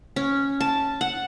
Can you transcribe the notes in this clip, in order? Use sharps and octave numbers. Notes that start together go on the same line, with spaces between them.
C#4
A5
F#5